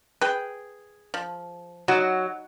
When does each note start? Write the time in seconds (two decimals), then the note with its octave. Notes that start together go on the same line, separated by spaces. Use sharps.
0.21 G#4 B4 G5
1.14 F3
1.88 F#3 D#4 F#4